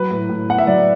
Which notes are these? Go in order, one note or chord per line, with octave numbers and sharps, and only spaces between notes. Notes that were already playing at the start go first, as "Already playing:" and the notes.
Already playing: F#3 B4
A2
A2
B3 F#5
E5
F#3 D5